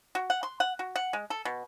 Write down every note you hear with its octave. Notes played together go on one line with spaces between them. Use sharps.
F#4
F#5
C6
F#5
F#4
F#5
G#3
A4
B2